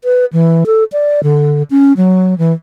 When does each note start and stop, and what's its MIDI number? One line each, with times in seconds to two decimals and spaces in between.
0.04 0.25 71
0.33 0.64 52
0.66 0.84 69
0.92 1.20 74
1.23 1.63 50
1.70 1.93 61
1.97 2.37 54
2.38 2.53 52